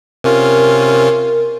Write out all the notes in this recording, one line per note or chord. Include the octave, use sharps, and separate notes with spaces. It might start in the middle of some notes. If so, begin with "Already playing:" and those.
C3 C#4 F4 A#4